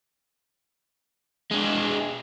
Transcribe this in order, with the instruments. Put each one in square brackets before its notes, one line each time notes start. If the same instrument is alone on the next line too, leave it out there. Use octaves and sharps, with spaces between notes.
[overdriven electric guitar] G#3 D4